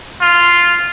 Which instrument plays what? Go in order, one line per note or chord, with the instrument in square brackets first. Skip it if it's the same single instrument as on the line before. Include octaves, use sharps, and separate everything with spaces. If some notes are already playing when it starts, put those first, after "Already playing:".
[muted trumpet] F4